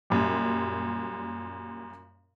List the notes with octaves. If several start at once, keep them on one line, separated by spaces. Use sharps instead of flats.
F#2 A#2 G3